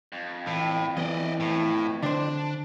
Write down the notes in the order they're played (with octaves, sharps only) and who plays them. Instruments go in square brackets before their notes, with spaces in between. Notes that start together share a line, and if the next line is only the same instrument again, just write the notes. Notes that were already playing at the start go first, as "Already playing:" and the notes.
[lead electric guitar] F2
[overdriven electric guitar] A2 [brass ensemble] E3 G5
[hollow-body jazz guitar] E2 [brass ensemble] E3 [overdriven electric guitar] D5 D#5
[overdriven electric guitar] A2
[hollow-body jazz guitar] D3 C5 [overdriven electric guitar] D4